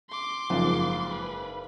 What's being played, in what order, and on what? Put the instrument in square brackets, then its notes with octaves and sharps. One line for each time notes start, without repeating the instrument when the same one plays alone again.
[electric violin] C6 D6
[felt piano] F#1 F5 [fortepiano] F2 G#2
[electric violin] B4